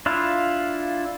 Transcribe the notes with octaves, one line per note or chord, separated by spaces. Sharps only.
D4 E4 F4 F5